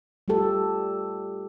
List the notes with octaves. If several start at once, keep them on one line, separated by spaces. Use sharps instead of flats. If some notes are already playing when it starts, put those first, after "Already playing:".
G3 A3 F4 G4 A4